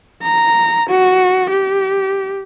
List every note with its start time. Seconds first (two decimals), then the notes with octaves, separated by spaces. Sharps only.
0.23 A#5
0.90 F#4
1.50 G4